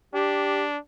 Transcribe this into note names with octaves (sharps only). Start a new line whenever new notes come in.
D4 G4